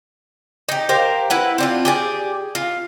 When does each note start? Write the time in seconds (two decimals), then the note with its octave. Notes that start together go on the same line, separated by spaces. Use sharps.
0.69 D#4 G4
0.89 G4 A#4 C5 F5
1.30 E4 B4 F#5
1.58 C4 D4 F4
1.85 G4 G#4 D5
2.55 F4